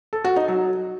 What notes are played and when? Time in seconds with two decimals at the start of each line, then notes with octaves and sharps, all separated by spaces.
0.13 A4
0.24 F#4
0.36 D#4
0.48 F#3